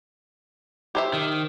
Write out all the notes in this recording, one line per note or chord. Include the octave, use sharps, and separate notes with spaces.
G4 C5 E5
D#3